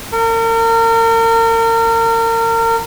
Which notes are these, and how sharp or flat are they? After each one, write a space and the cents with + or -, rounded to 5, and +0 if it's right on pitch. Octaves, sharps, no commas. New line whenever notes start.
A#4 -35